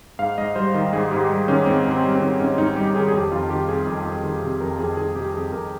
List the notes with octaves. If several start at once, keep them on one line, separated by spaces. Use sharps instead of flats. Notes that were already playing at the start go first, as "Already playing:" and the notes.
G#2 F5
G#2 D#5
G3 C5
D#3
G#2 G#4
G#2 G4
G3
D#3 C#4
G#2 C4
G#2
C4
G3
C4
D#3
G#2 C#4
G#2 D#4
G3 G4
D#3 G#4
G#4
F2 G4
F2 F4
D#3 G4
C3 G#4
F2
F2
D#3
C3
F2 A#4
F2 G#4
D#3 G#4
C3 G4
F2 G#4
F2 A#4